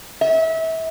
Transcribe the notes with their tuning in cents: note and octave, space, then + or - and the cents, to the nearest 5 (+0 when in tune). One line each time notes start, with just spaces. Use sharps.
E5 -30